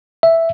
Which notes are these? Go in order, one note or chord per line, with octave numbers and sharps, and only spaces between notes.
E5